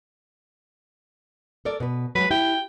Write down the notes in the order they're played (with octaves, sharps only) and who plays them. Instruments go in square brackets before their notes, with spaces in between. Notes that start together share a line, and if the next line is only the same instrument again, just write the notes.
[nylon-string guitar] A4 A#4 D5
B2 B4
[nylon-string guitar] F#3 G#3 [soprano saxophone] B4
[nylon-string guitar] E4 G4 [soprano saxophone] G5